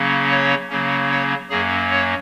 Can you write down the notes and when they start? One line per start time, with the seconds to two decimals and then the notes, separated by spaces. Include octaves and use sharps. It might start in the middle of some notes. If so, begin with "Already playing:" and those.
Already playing: C#3 F#3 A#3 C#4
0.31 C#5
0.70 C#3 F#3 A#3 C#4
1.11 C#5
1.50 F#2 F#3 A#3 C#4 G#4
1.91 C#5